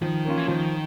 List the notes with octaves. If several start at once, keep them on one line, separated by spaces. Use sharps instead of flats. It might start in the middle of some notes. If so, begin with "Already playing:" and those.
D#3 F3
A#3 C#4 F4
E3
D#3 F3